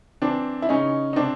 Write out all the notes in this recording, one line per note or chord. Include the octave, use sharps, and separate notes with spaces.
E3 C4 D4
E4
C#3 C#4 D#4
D#4
C3 C4 D4